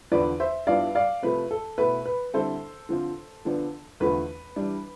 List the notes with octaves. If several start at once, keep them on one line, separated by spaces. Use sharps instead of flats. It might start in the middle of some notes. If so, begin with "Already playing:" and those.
E2 D3 F3 B4 D5
C5 E5
G2 F3 B3 E4 D5 F5
D5 F5
C3 F3 A3 B4
A4
B2 A3 E4 B4
B4
D3 G3 C4 E4 A4 C5
D3 F3 C4 F4
D3 F3 B3 D4
E2 D3 F3 A3 B4
E3 G3 D4